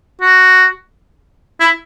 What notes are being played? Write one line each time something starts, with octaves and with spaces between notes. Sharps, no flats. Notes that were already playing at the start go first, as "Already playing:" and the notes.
F#4
E4